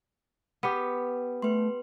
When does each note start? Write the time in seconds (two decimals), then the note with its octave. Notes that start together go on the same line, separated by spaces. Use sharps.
0.63 B3 G4 B4
1.42 A3 B4 C6